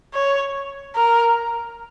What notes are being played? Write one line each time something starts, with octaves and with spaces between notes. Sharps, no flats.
C#5
A#4